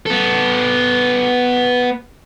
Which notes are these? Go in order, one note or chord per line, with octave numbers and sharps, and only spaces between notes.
B3 A4